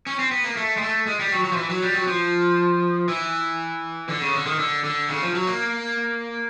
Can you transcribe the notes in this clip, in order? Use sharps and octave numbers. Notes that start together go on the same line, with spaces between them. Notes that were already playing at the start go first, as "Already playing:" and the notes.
C#4
C4
B3
A#3
A3
G#3
A3
G#3
G3
F#3
F#3
F3
E3
F#3
G3
F#3
F3
E3
D3
C#3
D3
D#3
D3
D3
C#3
F3
F#3
A#3